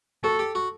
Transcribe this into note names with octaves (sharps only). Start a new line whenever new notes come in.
F#4 A4
G4
F#4